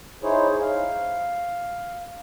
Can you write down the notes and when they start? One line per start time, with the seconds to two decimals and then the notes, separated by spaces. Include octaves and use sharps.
0.23 D#4 E4 G#4 C5 C#5
0.61 F5